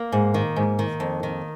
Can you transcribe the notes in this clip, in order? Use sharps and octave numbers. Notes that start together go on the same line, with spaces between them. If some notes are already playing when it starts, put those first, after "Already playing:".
Already playing: A#3
G#2
D#3
G#2
D#3
F2
D#3